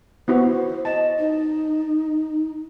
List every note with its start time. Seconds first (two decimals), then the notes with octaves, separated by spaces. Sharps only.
0.28 B3 E4 F#4 C5
0.85 D#5 A5
1.19 D#4